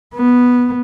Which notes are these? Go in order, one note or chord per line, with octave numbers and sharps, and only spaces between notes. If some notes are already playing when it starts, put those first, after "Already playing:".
B3